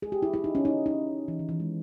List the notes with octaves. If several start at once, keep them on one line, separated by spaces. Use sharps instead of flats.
G#4
G4
E4
E4
D#4
C#4
D#4
D#4
E3
D#3
E3
G#3